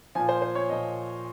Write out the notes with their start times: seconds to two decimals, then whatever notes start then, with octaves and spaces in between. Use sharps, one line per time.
0.15 A#2 F3 G#5
0.29 C5
0.42 C5
0.55 C#5
0.69 A#2 F3 D#5